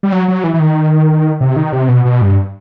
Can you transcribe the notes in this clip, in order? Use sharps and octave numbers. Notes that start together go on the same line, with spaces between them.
G3
F#3
F#3
E3
E3
D#3
C3
D#3
C3
B2
B2
G2